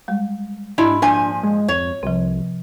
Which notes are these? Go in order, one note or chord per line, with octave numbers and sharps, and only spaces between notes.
G3 G#3
G#2 G#3 D4 E4
A#2 F3 D4 G#5
G#3
F2 C#5
C2 C3 F3